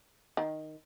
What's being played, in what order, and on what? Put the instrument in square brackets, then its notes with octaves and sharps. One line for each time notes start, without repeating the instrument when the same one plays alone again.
[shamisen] D#3